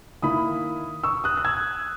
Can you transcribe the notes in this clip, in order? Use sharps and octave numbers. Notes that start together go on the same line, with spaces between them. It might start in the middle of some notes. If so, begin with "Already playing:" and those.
D#3 A#3 E4 B5 D#6
C#6 E6
D#6 F#6
F#6
E6 G#6